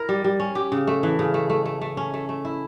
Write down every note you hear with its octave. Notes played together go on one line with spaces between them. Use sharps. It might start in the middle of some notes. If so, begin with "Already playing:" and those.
Already playing: E4 A#4
G3
G3
C#4
G4
C#3
A3
E3
C#3
A3
A3
A3
A3
C#4
A3
A3
E4